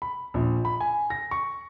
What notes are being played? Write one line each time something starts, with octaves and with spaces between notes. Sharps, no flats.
B5
A#1
B5
G#5
A#6
C#6